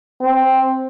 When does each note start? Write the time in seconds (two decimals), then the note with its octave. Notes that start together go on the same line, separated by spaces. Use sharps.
0.21 C4